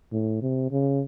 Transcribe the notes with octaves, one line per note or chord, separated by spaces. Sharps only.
A2
C3
C#3